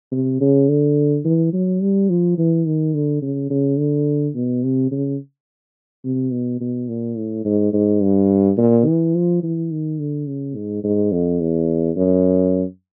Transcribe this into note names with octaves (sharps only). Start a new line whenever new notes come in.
C3
C#3
D3
E3
F#3
G3
F3
E3
D#3
D3
C#3
C#3
D3
B2
C3
C#3
C3
B2
B2
A#2
A2
G#2
G#2
G2
A#2
E3
F3
E3
D#3
D3
C#3
G#2
G#2
F2
E2
F#2